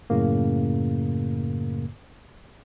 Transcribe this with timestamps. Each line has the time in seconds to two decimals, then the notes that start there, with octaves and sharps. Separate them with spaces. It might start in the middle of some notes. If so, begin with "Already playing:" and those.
0.10 F#2 A2 C#3 A#3